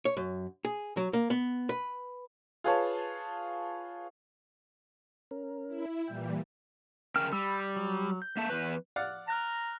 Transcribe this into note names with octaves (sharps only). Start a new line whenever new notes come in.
C#5
F#2
G#4
F#3
A#3
B3
B4
F4 G#4 B4 C#5 A5
C#4 A#4
E4
A#2 E3 G3 G5
C#3 A#4 G5 F6
G3 B5 E6
F#3
G6
A#3 E5 A5
E2 B4
D5 F5 F#5
A#5 F6 F#6 A#6